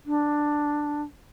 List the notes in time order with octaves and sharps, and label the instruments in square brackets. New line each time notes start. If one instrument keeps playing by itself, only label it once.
[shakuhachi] D4